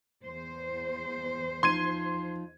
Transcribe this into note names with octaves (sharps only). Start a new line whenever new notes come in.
E2 C5
F3 D#4 C6 G#6 D#7